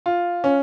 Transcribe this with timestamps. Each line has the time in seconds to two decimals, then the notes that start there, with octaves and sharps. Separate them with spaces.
0.06 F4
0.44 C#4